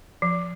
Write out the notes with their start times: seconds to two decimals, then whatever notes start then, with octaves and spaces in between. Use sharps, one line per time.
0.22 F3